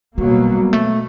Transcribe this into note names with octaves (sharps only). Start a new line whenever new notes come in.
B2 F#3 G3 A#3
A3